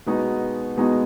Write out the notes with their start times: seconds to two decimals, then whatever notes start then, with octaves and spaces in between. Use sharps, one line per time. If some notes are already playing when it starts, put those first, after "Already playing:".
0.06 B2 G#3 B3 D#4 F#4
0.77 B2 G#3 B3 D#4 F#4